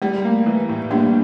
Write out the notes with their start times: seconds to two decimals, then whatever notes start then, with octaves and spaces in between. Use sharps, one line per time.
0.02 G3 A3
0.25 A#3
0.46 E3
0.69 A2
0.91 G3 A#3 D4